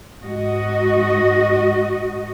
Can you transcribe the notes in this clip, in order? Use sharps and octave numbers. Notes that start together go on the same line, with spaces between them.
G#2 F#4 D#5